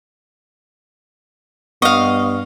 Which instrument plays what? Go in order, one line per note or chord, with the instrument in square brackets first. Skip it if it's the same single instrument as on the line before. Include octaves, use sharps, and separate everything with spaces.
[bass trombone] G2 [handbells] B3 [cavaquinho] D#5 F5 [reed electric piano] C#6